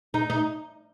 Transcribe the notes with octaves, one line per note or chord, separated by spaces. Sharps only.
D#4
D#4